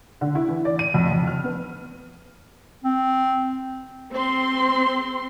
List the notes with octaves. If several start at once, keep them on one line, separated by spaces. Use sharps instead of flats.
D3
E4
E3
D5
D#7
F2
F2
F6
B3
C4
C4 C6